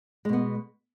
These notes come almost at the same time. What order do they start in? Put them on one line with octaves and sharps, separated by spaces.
G#3 B2 B3